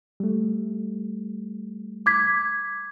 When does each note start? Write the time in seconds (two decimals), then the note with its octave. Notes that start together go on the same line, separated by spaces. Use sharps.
0.20 G3 A3
2.06 D6 G#6 B6